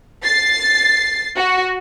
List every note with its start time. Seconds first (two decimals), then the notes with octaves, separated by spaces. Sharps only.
0.24 A6 C7
1.36 F#4